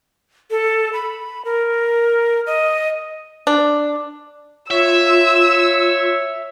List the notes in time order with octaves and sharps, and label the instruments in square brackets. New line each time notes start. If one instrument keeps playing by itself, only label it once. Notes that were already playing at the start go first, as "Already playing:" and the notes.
[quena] A4
B5
A#4
D#5
[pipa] D4
[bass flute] F4 [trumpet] C#5 [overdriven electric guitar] E5 [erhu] E6